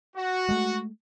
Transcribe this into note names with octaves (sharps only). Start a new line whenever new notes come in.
F#4
G#3 A3